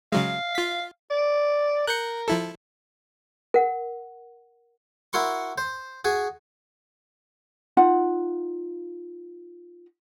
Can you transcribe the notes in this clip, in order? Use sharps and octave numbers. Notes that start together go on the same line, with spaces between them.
C#3 F#3 G#3 F5
F4 B6
D5
A#4 F#6 G6 C#7
F3 E4 A4
A#4 F#5
E4 F#4 A#4 C6 C#6
C5
F#4 G#4
D#4 F4 F#5